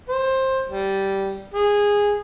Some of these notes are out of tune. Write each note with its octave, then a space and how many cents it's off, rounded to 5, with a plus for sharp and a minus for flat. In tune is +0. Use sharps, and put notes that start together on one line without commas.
C5 +15
G3 -10
G#4 -15